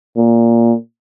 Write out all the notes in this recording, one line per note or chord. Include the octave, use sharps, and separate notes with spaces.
A#2